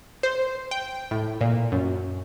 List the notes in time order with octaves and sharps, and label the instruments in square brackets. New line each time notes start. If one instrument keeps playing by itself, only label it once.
[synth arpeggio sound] C5
G5
A2
A#2
F#2